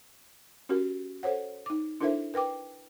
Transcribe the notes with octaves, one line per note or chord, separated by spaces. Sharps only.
C#4 F#4 G4 A#4
A4 C5 C#5 F#5
D#4 D6
D4 E4 A4 A#4 C5 E5
A#4 B4 G5 D6